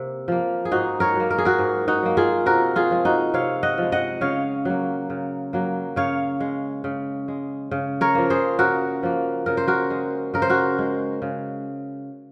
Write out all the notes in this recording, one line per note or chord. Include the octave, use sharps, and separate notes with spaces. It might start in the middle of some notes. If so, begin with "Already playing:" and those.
Already playing: C3 A#3
F3 A#3
G#4
G#2 D#4 F#4
A#4 C#5
F#3 A#3
A#4
G#4
F#4 A#4
G#2
D#4 F#4
F#3 A#3
F4 G#4
C3 F#4 A#4
F4 G#4
F3 G#3
D#4 F#4
C3 C#5 F5
D#5 F#5
F3 G#3
D#5 F#5
C#3 C#5 F5
F#3 A#3
C#3
F#3 A#3
C#3 C#5 F5
G#3
C#3
G#3
C#3
A#4 C#5
F3 A#3
G#4 C5
C#3 F#4 A#4
F3 A#3
C#3 A#4
C5
F#4 A#4
G#3
C#3 A#4
C5
F#4 A#4
G#3
C#3